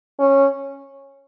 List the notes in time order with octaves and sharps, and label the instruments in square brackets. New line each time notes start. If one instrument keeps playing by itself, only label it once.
[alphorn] C#4